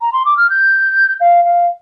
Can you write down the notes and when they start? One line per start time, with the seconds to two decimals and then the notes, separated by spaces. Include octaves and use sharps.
0.00 A#5
0.13 C6
0.25 D6
0.37 F6
0.50 G6
1.21 F5
1.45 F5